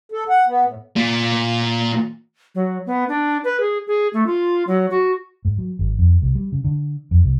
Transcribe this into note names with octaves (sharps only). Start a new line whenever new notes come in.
A4
F#5
B3
A2
A#2
F#3
B3
D4
B4
G#4
G#4
A3
F4
F#3
F#4
G#2
F#3
G#1
F2
C2
G3
C#3
D3
F2
C2